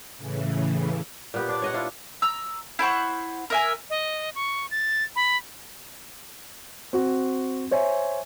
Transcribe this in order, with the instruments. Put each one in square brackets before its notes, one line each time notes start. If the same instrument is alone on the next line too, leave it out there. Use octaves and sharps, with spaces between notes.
[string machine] A2 C#3 E3
[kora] A#2 B3 G4
D4 D5
C#5 D#5 F#5
D4 E4 F4
[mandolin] A#5 E6
E4 C5 F#5 C#6
A#4 E5 G#5
[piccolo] D#5
C#6
A6
B5
[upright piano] C4 F#4
C5 C#5 E5 G#5